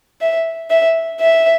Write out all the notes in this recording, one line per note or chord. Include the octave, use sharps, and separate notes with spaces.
E5
E5
E5